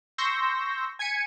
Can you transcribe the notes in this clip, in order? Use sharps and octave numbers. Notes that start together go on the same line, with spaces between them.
C6 C#6 E6 G6 A#6
G#5 G#6 B6 C#7 D#7